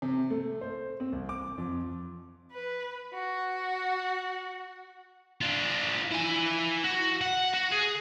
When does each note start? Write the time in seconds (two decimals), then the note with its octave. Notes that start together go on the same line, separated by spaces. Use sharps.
0.02 C3
0.30 A3
0.61 C5
1.00 C4
1.12 C2
1.29 D6
1.58 F2
2.51 B4
3.12 F#4
5.41 D4 F4
6.11 E4 G#5
6.84 F#4
7.21 F#5
7.53 F#4
7.72 G#4